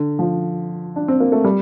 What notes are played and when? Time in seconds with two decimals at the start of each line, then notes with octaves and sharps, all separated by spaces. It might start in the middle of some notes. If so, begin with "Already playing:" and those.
Already playing: D3
0.19 F3
0.96 D4
1.08 C4
1.20 A#3
1.32 A3
1.44 G3